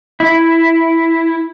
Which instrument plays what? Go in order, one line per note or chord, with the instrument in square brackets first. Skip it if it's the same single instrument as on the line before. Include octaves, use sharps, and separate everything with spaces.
[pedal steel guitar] E4